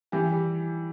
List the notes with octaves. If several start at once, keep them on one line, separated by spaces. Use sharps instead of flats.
E3 G4
G3